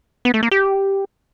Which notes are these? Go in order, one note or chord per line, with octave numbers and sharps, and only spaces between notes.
B3
A3
A#3
G4